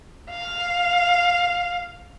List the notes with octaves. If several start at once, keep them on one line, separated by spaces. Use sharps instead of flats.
F5